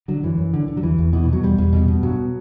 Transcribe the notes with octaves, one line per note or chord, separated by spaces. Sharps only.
D3 F#3
F#2 E3
F#2
D3
D3
F#3
E2 E3
E2
B2 E3
E3
B2 F#3
E2 G3
E2
B2
B2
G2 F#3